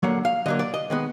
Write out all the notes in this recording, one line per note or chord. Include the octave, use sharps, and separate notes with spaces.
D3 F#3 A#3 F#5
F5
D3 F#3 A#3 D#5
D5
D#5
D#3 G#3 B3